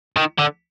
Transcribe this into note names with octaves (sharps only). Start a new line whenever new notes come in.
D#3
D3